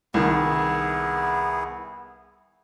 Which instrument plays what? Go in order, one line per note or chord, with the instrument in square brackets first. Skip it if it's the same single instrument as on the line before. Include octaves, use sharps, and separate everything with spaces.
[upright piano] C2 D#3 [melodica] B3 E4 G#4